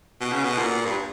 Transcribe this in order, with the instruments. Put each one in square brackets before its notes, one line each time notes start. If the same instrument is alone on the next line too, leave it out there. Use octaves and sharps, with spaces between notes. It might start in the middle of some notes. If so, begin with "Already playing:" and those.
[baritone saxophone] B2
C#3
B2
A#2
G2